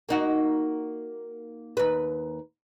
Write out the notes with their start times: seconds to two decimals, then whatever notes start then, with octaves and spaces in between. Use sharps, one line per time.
0.09 A#3 D#4 F#4
1.77 D#2 B4